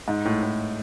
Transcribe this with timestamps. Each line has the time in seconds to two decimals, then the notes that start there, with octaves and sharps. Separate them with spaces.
0.08 G#2
0.25 A2
0.43 A2